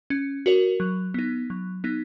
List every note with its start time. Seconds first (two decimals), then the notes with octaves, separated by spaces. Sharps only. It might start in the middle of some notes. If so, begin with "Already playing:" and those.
0.10 C#4
0.46 F#4 A#4 C#5
0.80 F#3
1.14 B3 D#4
1.50 F#3
1.84 B3 D#4